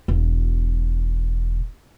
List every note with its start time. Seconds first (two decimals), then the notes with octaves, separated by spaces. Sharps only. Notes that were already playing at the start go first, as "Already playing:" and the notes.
0.08 E1 B1